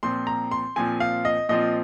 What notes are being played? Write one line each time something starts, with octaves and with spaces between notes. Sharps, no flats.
A#2 F3 C4 C6
A#5
C6
A#2 F3 C4 G#5
F5
D#5
A#2 F3 C4 D#5